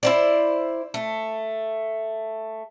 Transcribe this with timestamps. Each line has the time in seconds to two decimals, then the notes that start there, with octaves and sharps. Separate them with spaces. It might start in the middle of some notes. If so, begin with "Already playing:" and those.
0.03 E4 C5 D5
0.94 A3